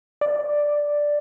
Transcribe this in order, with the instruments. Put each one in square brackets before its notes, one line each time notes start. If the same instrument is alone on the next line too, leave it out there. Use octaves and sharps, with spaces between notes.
[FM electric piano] D5